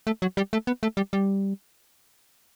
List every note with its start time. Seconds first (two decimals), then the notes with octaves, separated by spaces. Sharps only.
0.07 A3
0.22 F#3
0.37 G3
0.53 A3
0.67 B3
0.83 A3
0.97 G3
1.13 G3